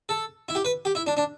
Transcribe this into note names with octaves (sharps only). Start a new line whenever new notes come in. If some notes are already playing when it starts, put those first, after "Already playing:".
A4
E4
G4
B4
G4
E4
D4
D4